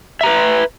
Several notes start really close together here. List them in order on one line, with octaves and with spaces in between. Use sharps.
E5 A#5 B4